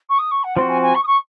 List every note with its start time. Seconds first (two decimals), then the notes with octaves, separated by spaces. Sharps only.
0.09 C#6
0.19 D#6
0.31 C#6
0.44 F#5
0.56 F3 C4 F#4 C6
0.69 G#5
0.82 G#5
0.95 C#6
1.03 D#6
1.07 C#6